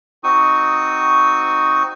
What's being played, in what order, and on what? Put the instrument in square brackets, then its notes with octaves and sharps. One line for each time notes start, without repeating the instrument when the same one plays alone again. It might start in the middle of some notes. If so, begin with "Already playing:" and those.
[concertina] C4 D#4 F#4 C#6 D#6